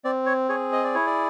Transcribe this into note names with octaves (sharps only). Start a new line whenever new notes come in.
C4 D5
C#5
G#4 C#5
D#5
D5
E4 C#5
D5